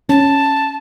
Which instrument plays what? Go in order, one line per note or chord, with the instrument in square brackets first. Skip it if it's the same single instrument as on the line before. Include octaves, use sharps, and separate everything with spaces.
[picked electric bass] C#4 [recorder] A5